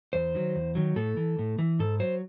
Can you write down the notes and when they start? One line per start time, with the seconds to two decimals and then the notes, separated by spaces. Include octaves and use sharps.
0.13 E2 C5
0.35 D#3 F#3
0.56 E2
0.75 D#3 F#3
0.96 A2 A4
1.17 E3
1.39 A2
1.58 E3
1.79 G#2 A4
2.00 F#3 C5